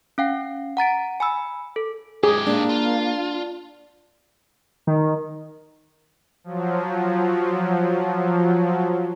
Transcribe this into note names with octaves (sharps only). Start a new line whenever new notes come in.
C#4 F5 G5
F#5 A#5 A6 D7
G#5 B5 E6
A4
G#2 G4 G#4
A#3 D4
F4
D#3
F3 F#3